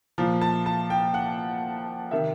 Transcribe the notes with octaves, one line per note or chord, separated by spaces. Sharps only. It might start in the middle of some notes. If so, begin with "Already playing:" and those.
A#2 F3
A5
A5
G5
F#5
C3 D#3 E5